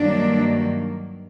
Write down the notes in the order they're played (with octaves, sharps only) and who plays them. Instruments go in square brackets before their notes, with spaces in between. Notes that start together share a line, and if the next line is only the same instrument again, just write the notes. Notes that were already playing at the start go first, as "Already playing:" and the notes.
Already playing: [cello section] G2 D#3 F#3 A#3 D4